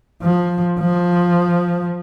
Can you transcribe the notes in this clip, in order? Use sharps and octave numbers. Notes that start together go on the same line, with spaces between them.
F3
F3